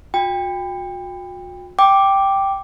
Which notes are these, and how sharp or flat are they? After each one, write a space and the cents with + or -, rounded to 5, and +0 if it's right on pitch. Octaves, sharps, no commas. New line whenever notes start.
F#4 -45 G5 +25
G5 +0 D6 +0